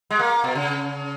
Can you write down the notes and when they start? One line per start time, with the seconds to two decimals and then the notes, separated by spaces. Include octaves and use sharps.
0.11 G#3
0.19 A#3
0.44 B2
0.55 C#3